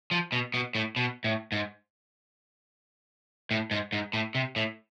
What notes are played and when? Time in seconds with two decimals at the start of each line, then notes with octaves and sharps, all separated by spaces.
0.11 F3
0.32 B2
0.54 B2
0.75 A2
0.96 B2
1.24 A2
1.52 G#2
3.51 A2
3.71 G#2
3.93 G#2
4.13 A2
4.35 C3
4.56 A2